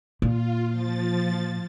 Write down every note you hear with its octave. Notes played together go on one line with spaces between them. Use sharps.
A#2 F4
F3 A6